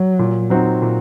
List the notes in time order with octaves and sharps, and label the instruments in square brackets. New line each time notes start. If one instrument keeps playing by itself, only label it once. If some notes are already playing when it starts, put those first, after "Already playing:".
Already playing: [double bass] F#3
[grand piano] A#2
F#3 C4 D#4 F#4
A#2